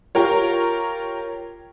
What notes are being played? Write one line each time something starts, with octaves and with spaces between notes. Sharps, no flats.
F4 G4 A#4 C#5